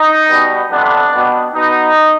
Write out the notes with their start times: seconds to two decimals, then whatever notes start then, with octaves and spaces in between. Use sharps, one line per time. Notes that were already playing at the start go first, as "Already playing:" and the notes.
Already playing: D#4
0.28 B2 G3 B3
0.70 F2 C3 G3 B3 D4
1.12 B2 G3 B3
1.54 B2 B3 D#4